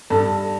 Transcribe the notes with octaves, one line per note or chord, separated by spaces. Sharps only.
G2 A4